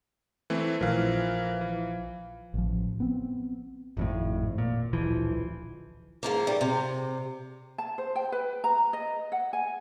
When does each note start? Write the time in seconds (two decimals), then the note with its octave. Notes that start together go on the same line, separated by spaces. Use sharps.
0.50 E3 A3 C4
0.81 A#1 E3 F3 A#4 F5
1.61 E3
2.54 A1 F3
3.00 B3 C4
3.97 G#1 F2 A2
4.58 A#2
4.93 D1 A#1 E3 F3
6.23 G#2 F3 A#3
6.47 G3
6.61 C3
7.78 A5
7.98 C5
8.15 G5
8.32 B4
8.64 A#5
8.93 D#5
9.32 F#5
9.53 G#5